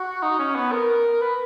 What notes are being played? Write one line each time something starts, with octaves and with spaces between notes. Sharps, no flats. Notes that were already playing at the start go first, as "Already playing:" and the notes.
Already playing: F#4
D#4
C#4
B3
A#4
B4